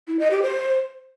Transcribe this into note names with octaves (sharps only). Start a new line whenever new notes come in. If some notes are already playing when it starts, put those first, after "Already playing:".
E4
D#5
G4
C5